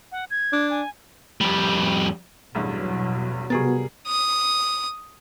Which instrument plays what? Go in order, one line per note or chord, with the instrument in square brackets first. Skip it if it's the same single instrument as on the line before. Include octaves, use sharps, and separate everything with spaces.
[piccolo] F#5
G#6
[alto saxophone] D4
[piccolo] G#5
[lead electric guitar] F2 G3
[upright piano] A1 E2 G2 [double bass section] B2 F#3
[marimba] C3 A6 [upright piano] G3 G#4 A#4 [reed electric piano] B3 F#4
[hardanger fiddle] D#6